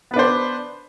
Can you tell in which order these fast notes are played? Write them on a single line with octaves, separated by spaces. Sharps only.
B3 B4 D4 C5